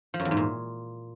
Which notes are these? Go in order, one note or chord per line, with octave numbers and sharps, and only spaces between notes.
F3
F#2
E2
G#2
A#2